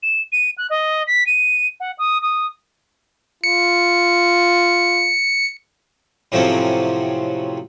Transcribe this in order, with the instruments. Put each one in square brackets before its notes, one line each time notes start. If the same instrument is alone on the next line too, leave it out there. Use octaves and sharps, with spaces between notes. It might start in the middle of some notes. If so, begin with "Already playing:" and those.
[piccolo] E7
D#7
F#6
D#5
B6
D#7
F#5
D#6
D#6
[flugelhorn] F4 [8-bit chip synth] C#7
[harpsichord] A2 C3 F3 F#3 C4 C#4